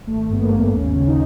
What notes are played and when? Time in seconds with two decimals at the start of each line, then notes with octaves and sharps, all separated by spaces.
0.07 G#1 A3
0.29 G2 B3
0.40 A#3
0.52 G#1
0.73 D#2 C#4
0.96 C#3
1.07 D#4